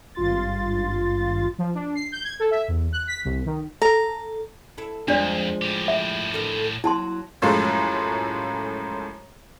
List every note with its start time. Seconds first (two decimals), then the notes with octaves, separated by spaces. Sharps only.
0.15 G#1 G2 F4 C6 A6
1.58 F3
1.75 D4
1.95 C7
2.12 G6
2.24 G#6
2.40 A4
2.51 E5
2.68 E2
2.92 F#6
3.07 B6
3.25 C2
3.46 D#3
3.82 A4 A#5
4.78 E4 A4
5.08 F2 F3 G#3 D4 D5
5.62 A2 G4
5.88 E5
6.32 D2 A4 A#4
6.84 F#3 A#3 E4 A5 C6
7.42 F#2 A2 F3 G#3 A3